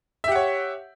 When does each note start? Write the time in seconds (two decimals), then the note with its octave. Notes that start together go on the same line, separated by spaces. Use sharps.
0.24 E5
0.28 G4
0.32 F#5
0.36 C#5